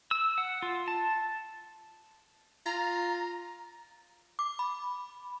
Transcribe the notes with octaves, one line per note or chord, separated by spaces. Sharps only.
E6
F#5
F4
A5
F4 A#5
D6
B5